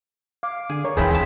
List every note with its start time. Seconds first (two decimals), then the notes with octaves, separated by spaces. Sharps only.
0.43 F5 D6
0.70 D3 G#4
0.85 A#4 C#5
0.97 D#2 E3 C4 E4 F4 G#4 B4 G5
1.11 C4 A5 B6